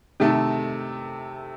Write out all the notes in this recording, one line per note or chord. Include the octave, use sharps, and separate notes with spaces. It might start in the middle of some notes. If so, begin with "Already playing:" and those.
C3 D#3 A3 D#4 A4